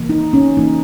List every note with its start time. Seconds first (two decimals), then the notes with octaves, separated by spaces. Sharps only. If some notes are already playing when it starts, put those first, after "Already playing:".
Already playing: C#3 E3 A#3
0.09 D#4
0.33 C#4
0.57 C#3 E3 A#3 D#4